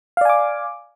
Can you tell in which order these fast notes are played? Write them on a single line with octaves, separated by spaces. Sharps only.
F5 D5 G#5 D6